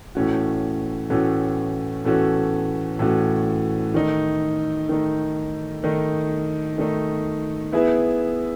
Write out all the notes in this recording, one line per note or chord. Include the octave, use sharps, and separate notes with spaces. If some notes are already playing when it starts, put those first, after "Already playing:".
A2 E3 A3 C#4 F#4
A2 E3 A3 C#4 F#4
A2 E3 A3 C#4 F#4
A2 E3 A3 C#4 F#4
D#3 A3 D#4
D#3 A3 D#4
D#3 A3 D#4
D#3 A3 D#4
B3 E4 G#4 B4 E5